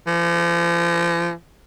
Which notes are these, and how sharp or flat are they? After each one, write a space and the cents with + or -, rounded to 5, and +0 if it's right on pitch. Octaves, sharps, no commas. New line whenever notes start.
F3 -40